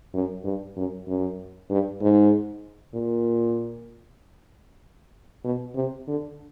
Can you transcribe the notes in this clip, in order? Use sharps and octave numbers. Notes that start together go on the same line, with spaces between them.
F#2
G2
F#2
F#2
G2
G#2
A#2
B2
C3
D3